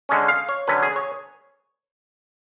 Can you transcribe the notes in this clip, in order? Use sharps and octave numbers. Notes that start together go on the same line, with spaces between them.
D3 G#3 C#4
F5
C#5
D3 F#3 C#4 B4
G#4
C#5